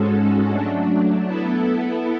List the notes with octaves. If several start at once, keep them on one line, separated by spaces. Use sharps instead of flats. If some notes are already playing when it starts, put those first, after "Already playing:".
Already playing: G#2 G#3 C#4 F#4 A4
F#3 A3 D4
B3 E4 A4